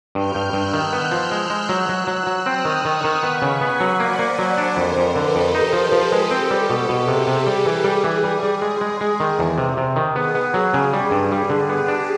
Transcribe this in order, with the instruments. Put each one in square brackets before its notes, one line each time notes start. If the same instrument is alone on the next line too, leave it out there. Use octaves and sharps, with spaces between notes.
[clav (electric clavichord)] G2 [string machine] F6 G6
[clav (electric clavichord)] G2
[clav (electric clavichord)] G2 [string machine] E6 F#6
[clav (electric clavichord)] D#3
B3
F3
G#3
G#3
F#3
F#3
F#3
F#3
[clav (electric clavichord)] C4 [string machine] D#6 F6
[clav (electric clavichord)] D#3
[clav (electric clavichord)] D#3 [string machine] C#6 D#6
[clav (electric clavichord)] D#3
[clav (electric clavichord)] B3 [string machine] B5 C#6
[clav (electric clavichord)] C#3
[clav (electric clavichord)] B3 [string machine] F#5 G#5
[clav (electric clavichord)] F#3
[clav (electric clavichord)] A#3 [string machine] C5 D5
[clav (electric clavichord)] A#3
F#3
D4
[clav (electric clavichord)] F2 [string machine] A#4 C5
[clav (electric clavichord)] F2
[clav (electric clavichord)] D3 [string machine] A4 B4
[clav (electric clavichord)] F2
[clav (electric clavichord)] D#4 [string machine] G4 A4
[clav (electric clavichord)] F3
[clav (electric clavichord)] F3 [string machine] A4 B4
[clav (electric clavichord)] G#3
[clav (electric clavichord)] C4 [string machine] G4 A4
[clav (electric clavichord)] G3
[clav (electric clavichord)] B2 [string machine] G4
[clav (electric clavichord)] B2
[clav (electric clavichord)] C3 [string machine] G#4
[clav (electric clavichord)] C3
[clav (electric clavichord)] G3 [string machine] G#4
[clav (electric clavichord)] E3
[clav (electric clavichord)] G3 [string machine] G#4
[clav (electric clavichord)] E3
G3
G3
G#3
G#3
G#3
D#3
E2
C3
C3
D#3
[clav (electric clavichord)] B3 [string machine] G#4
[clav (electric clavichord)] B3
F#3
C#3
G3
G2
G3
D3
[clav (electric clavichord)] B3 [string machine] G4
[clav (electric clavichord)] D4